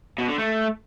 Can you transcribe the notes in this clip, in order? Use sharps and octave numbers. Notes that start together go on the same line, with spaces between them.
B2
D3
A3